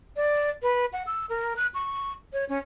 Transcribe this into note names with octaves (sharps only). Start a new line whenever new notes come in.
D5
B4
F#5
E6
A#4
F#6
C#6
C#5
C#4